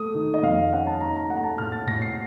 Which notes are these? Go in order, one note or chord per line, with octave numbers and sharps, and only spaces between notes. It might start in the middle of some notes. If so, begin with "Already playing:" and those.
Already playing: A3 D#6
D#3
D#5
F2 F5
C#4 F#5
A5
D#4 A#5
A#5
A3 F#5
A#5
A5
A2 F6
A6
A2 A#6
C7